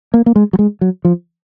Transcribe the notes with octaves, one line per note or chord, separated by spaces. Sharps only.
A#3
A#3
G#3
F#3
G#3
F#3
F3